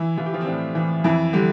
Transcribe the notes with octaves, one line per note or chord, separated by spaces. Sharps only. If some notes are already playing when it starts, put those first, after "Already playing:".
Already playing: E3 E4
E3 F4
G4
F3 F4
C4
A2 D4
E3
F2 E3 E4
D3 G3 G4